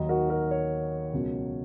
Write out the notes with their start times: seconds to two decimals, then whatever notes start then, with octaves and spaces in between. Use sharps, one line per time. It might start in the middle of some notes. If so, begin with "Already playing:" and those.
Already playing: D#2 D#3 F#3 D#4
0.09 F#4 A#4
0.30 F#4 A#4
0.51 A#4 C#5
1.13 C#2 B2 F#3